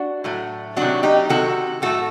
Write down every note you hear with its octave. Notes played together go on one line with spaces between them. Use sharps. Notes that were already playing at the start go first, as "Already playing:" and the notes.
Already playing: D4 F#4
A2 F#3 A3
C3 D#3 F#3 D4 F#4
D#4 G4
C3 D#3 F#3 F#4 A4
A2 A3 F#4 A4